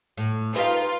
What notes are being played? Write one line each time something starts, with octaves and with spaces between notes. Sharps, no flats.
A2
D#4 F4 G4 B4 F5